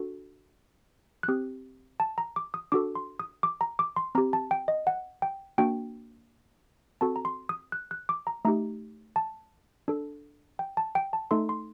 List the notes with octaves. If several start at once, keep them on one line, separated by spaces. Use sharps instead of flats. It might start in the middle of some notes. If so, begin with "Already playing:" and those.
Already playing: D4 F#4 A4
F#6
C4 G4 D#6
A5
A#5
D6
D#6
D4 F#4 A4 D6
C6
D#6
D6
A#5
D6
C6
C4 G4 A#5
A5
G5
D#5
F#5
G5
A#3 D4 F#4 G5
C4 F#4 A4 A5
A#5
C6
D#6
F#6
F#6
D6
A#5
A3 D#4 G4 A#5
A5
D4 A4
G5
A5
G5
A5
A3 D#4 A4 C6
C6